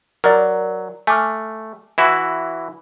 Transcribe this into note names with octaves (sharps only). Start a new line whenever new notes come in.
F#3 A#4 D5
A3 G#5 D6 F6
E3 E4 F#4